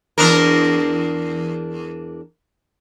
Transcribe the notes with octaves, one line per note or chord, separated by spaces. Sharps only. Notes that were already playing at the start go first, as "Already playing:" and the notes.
E2 D4 A#4